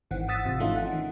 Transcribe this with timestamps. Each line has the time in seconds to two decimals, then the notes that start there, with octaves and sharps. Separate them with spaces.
0.11 G#1 D#3 E3 C4 F#5
0.28 F#5 D#6 E6 A6 B6
0.45 G#1 C3 F4
0.59 E3 F3 A3 C#4 D#4 F4
0.76 F#5
0.92 D#3